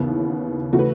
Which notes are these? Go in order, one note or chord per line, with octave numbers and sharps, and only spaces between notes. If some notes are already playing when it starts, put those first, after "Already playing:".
Already playing: D#2 C#3 E3 B3 E4
C#3 E3 A3 F#4
B4